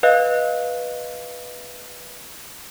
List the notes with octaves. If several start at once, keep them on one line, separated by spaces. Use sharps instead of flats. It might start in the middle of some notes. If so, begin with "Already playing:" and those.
B4 D#5 F5 F#6